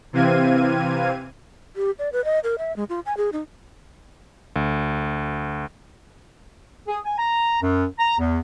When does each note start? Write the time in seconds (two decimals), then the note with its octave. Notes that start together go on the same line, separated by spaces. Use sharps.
0.13 C3 E3 C4 F5 G#6 D#7
1.76 G4
1.99 D5
2.13 B4
2.25 D#5
2.44 A#4
2.58 E5
2.76 G#3
2.89 F4
3.06 G#5
3.17 G#4
3.32 D#4
4.56 D2
6.87 G#4
7.05 G#5
7.18 A#5
7.61 F#2
7.99 A#5
8.18 E2